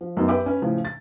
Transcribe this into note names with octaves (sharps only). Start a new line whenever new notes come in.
F3
F#2 F#3 B3 D#4
G4 B4 E5 G5 D6
C#4 B4
A2 C#3 F3
A6